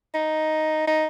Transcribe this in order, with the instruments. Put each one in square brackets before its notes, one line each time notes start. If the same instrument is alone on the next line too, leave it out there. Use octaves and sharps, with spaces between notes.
[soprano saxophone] D#4
D#4